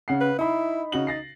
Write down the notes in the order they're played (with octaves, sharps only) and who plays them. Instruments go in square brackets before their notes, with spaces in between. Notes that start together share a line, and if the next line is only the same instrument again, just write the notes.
[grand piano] C#3 F#5 C7
[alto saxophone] B4
[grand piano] D#4 B5 [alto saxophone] E4
[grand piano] C#3 F#4 F#7 [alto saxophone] D#4
[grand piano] A6 A#6 C7